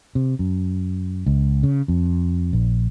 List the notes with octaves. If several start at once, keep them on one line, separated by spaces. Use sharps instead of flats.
C3
F#2
C#2
C#3
F2
A#1